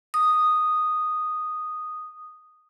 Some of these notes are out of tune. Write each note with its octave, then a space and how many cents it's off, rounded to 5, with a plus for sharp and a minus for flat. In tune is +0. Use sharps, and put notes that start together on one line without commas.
D#6 -5